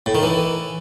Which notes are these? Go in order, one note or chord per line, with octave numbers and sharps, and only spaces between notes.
A2
D#3
E3